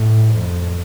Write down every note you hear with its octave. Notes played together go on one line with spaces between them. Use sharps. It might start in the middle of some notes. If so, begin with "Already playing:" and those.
Already playing: A2
F2